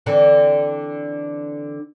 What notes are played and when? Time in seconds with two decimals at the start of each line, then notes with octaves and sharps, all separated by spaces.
0.06 D3 E3 C4